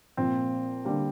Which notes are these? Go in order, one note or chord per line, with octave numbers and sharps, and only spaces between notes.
A#2 F3 A#3 C4
D3 G3 A#3